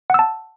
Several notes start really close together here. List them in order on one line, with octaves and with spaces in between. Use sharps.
F#5 E6 A5